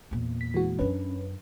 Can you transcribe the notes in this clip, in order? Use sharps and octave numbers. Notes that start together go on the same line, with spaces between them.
E2 A#2
B6
E3 G#3 F#4
F#2 C#4 D4 B4